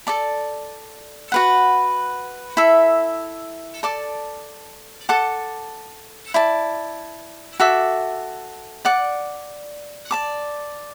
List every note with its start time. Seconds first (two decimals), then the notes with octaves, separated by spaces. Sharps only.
0.07 A4 D5 A5
1.32 F#4 B4 F#5
2.57 E4 A4 E5
3.83 A4 D5 A5 D6
5.09 A4 F#5 A5 D6
6.34 E4 D5 A5
7.60 F#4 A4 E5 D6
8.85 D5 F#5 D6
10.11 D5 A5 D6